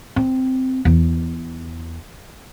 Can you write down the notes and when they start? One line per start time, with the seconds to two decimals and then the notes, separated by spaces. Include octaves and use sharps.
0.16 C4
0.85 E2